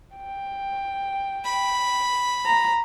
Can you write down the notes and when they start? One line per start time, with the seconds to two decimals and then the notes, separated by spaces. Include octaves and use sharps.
0.16 G5
1.45 B5
2.46 A#5